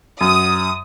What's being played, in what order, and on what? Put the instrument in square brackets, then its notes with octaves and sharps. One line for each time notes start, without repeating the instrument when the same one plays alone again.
[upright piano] F#2 [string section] D#6